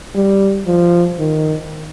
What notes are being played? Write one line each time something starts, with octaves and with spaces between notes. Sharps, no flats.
G3
F3
D#3